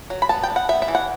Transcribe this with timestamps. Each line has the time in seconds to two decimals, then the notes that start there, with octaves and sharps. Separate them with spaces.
0.10 F#3
0.22 B5
0.29 B3 A5
0.43 G5
0.50 D4
0.56 F#5
0.69 B3 E5
0.82 E5
0.88 E3
0.95 F#5